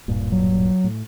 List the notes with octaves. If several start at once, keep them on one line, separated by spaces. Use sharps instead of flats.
D1 G2 A#2
F#3
A2